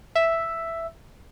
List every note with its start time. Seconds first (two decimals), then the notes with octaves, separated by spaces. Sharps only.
0.15 E5